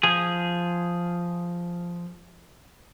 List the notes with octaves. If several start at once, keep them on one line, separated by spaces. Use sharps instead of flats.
F3 G#4